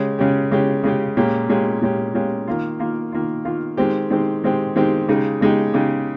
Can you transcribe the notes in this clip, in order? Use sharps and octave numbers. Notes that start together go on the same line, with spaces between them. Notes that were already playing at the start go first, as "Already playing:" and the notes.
Already playing: C#3 G#3 C#4 G4
C#3 G#3 C#4 G4
C#3 G#3 C#4 G4
C#3 G#3 C#4 G4
A#2 G#3 C#4 G4
A#2 G#3 C#4 G4
A#2 G#3 C#4 G4
A#2 G#3 C#4 G4
D#3 A#3 F4
D#3 A#3 F4
D#3 A#3 F4
D#3 A#3 F4
D#3 G#3 C4 G4
D#3 G#3 C4 G4
D#3 G#3 C4 G4
D#3 G#3 C4 G4
C#3 G#3 D#4 G4
C#3 G#3 D#4 G4
C#3 G#3 D#4 G4